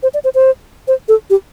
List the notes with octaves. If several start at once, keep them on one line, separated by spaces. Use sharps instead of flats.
C5
D5
C5
C5
C5
A4
G4